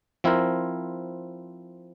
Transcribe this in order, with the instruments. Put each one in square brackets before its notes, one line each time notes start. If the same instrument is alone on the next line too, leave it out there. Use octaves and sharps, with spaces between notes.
[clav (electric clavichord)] F3 C4 E4 A#4